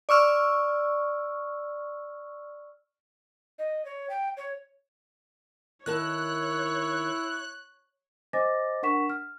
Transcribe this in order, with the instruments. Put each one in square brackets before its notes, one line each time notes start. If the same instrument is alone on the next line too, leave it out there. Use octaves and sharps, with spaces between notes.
[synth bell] D5 C#6 E6 F6
[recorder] D#5
C#5
G5
C#5
[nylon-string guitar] D#3 A#4 A5 [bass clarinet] E4 [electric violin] C#5 [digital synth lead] F#6
[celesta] C5 D#5 G#5 D6 A6 A#6
D4 A#4 F#5 C#6 B6 E7
F6